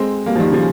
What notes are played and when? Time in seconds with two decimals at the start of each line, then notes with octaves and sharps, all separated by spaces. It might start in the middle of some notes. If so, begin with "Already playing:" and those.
Already playing: G#3 C4
0.26 G3 A#3
0.35 F3
0.39 D#3 G3
0.52 C#3 F3